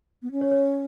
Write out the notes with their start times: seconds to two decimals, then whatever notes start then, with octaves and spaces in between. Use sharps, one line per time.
0.22 B3
0.32 C#4
0.41 C#5
0.51 C#5